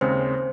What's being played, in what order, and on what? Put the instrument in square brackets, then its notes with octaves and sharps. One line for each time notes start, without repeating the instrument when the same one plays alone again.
[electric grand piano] D#2 C#3 G#3 C4 [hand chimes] C5